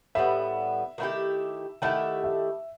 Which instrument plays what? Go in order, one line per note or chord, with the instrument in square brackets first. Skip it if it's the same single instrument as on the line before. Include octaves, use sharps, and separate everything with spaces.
[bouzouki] A2 G3 B3 [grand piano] E5
[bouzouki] D#3 A3 E4 G4
[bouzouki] D#3 A3 E4 G4 [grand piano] F#5
[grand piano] E5